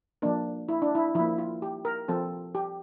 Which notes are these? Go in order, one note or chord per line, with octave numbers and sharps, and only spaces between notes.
F3 A#3 D4
E4
D4
E4
F3 E4
A#3
F4
G4
A#4
F3 C4 A4
G4